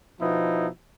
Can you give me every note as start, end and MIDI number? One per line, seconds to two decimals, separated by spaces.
0.20 0.68 47
0.20 0.68 53
0.20 0.68 59
0.20 0.68 63
0.20 0.68 64